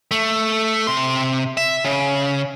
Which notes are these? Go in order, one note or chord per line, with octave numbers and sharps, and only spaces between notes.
A3
C3 C6
E5
C#3